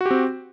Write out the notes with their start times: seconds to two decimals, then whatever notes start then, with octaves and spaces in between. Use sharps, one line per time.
0.01 F#4
0.06 G4
0.11 C4